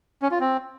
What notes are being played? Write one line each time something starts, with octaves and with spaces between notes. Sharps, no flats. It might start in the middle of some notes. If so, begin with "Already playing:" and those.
C#4
F4
C4